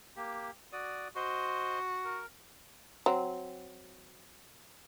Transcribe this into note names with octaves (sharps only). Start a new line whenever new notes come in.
A#3 G4
F#4 D5 D#6
F#4 C5 D#5 C6
A#4
F#3 C4